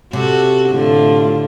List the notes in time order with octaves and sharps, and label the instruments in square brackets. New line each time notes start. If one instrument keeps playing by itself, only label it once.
[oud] C3 [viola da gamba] F#4 A4
[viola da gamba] A2 D3 [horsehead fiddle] A3 F4